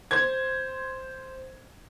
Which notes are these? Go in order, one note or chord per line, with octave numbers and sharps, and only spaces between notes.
C5 G#6